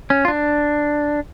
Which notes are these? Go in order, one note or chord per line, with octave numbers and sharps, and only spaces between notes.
C#4
F4
D4